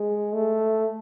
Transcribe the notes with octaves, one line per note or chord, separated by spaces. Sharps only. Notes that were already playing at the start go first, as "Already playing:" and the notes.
Already playing: G#3
A3